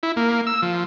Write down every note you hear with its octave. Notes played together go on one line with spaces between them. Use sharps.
E4
A#3
E6
F3